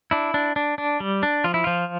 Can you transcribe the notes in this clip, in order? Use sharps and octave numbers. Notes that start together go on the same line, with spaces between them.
D4 E4
D4
D4
D4
G3
D4
F3 F4
E4
F3 F4